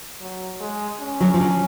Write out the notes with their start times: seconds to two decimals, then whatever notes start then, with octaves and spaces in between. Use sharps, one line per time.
0.21 F#3
0.60 G#3
1.00 C#4
1.20 D3 F#3
1.34 F3
1.40 D3 F#3